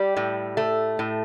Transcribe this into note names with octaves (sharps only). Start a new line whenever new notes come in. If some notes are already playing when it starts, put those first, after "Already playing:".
Already playing: G3 G4
A2
A3
A2